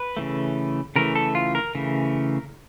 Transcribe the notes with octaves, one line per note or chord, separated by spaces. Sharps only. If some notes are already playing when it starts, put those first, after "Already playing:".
Already playing: B4
C#3 E3 A3
C#3 E3 A3 A#4
A4
F4
A#4
C#3 E3 A3